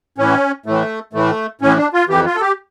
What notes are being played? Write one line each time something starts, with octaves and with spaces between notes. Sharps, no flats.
A2 E3 C#4
A2 E3 A3
A2 E3 A3
A2 E3 C#4
D4
F4
F2 E3 G4
F4
A4
G4